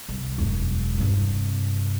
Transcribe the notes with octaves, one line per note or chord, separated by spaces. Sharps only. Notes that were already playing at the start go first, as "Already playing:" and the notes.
C2
E1 F#2
G2 C3